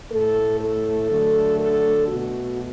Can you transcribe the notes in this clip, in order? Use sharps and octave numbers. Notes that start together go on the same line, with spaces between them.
A2 A3 A4
A4
D3 F#3 A3
A4
B2 A3 F#4